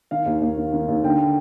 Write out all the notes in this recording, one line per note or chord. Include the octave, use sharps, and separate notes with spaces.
D#3 F5
D#2
D#2
D#3
D#3
D#2
D3 G5